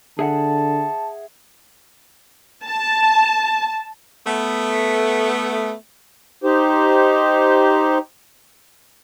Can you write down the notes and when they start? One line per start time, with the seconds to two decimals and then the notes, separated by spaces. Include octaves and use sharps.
0.19 D3 G#4 E5 F#5 A5
2.65 A5
4.26 A3 B3
6.42 D#4 G4 C5